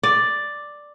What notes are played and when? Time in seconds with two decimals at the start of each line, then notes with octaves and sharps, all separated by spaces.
0.03 D5